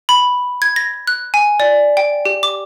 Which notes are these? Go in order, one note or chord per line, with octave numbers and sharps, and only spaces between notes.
B5
G#6
A#6
F#6
G#5
D5
G5
G4
D6